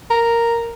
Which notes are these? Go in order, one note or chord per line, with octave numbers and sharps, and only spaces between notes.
A#4